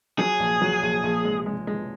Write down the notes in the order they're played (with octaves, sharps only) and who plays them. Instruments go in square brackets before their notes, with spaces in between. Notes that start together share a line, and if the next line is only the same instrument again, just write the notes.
[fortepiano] F#3 [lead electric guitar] G#4
[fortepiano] A#1
F#3
A#1
A#1
G#3
G#3
G#3